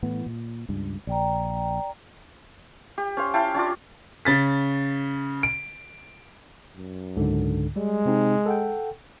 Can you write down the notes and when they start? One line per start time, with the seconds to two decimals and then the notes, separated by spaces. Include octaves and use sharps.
0.03 A2 E3 B3
0.26 A#2
0.69 C#2 G2
1.07 A#1 D5 G5 A#5
2.98 G4
3.17 C#4 C5 F5
3.34 E4 F5 G5 A5
3.54 C#4 D4 F4 D5
4.25 C#3 A6 B6
5.43 D7
6.77 F#2
7.17 C#2 G#2 D3
7.76 G3 G#3
8.06 C3 C4 D#4
8.46 A4 F#5 G5